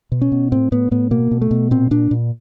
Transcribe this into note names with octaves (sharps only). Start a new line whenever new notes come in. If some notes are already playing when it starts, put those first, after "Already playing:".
B2
C#4
B2
A2 C4
A2 B3
A2 B3
B2 A#3
B2
A3
B2
A#2 C4
A#2 D4
A#2